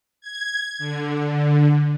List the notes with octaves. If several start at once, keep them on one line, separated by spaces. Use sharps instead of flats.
G#6
D3